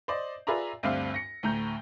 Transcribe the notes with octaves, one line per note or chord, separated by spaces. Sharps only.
C5 D5 D#5
F4 G#4 B4 D5 E5 A#5
D2 G2 C4 D4 E5 F5
A#6 C#7
D2 A2 A#5 G6